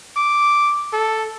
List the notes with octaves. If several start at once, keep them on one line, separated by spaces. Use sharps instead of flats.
D6
A4